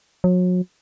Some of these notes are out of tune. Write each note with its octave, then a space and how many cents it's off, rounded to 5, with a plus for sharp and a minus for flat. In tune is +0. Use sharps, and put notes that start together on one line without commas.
F#3 -35